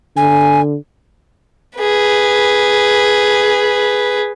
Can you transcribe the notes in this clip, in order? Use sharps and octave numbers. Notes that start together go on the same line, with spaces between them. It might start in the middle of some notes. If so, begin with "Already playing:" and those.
D3 G#5
G#4 B4